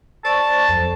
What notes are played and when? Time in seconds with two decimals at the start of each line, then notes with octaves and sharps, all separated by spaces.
0.25 C5 D5 A5 C#6
0.69 F2 A4 C5